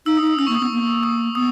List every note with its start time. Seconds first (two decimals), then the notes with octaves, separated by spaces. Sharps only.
0.06 D#4 E6
0.17 D#6
0.22 D#4
0.27 D#6
0.38 C#4 E6
0.47 A#3 C#6
0.54 D#6
0.61 B3 E6
0.71 A#3
1.03 D#6
1.35 B3 D#6